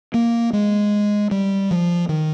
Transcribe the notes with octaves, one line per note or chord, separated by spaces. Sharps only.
A#3
G#3
G3
F3
D#3